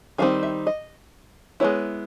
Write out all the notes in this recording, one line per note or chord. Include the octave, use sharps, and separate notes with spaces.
D#3 G3 C4 D#4 F5
E5
D#5
G#3 B3 E4 C#5